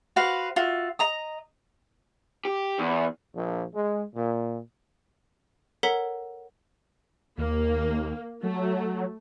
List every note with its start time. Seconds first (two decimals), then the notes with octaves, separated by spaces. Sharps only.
0.16 F#4 B4 C5 F5
0.56 F4 F#4 E5
0.99 D#5 A#5 D#6
2.45 G4
2.79 E2
3.34 A#1
3.75 G#3
4.15 A#2
5.83 A4 A#4 C#5 F#5 A#5 B6
7.38 D#2 A#3
8.43 F#3 A3